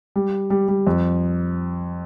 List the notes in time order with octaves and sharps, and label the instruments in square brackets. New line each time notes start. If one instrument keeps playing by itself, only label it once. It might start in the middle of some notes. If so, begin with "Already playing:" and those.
[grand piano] G3
G3
G3
F2